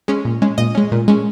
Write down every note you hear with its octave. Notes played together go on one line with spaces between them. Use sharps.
G#3 C#4
A#2
G#3 C#4
A#2 D#5
G#3 C#4
A#2
G#3 C#4